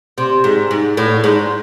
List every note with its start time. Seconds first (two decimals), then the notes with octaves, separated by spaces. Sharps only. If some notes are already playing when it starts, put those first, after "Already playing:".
0.18 C3
0.44 G#2
0.71 G#2
0.97 A2
1.24 G#2